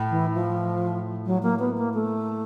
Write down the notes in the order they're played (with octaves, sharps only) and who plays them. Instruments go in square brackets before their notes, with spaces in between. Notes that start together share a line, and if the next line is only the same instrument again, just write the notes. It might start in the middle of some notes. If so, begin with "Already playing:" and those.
Already playing: [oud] A2
[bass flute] E3
F3
F#3
A#3
B3
A#3
A3